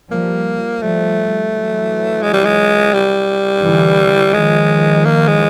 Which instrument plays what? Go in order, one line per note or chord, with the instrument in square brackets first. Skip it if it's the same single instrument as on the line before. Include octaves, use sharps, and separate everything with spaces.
[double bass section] F3 G3 [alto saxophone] A#3
[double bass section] F3 G3 [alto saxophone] A3
[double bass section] E3 F#3
[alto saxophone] G#3
G3
G#3
G3
[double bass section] D3 E3
[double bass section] D#3 F3 [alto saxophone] G#3
[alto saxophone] A#3
G#3